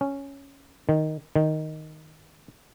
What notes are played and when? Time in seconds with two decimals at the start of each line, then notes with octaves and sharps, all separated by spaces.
0.01 C#4
0.89 D#3
1.36 D#3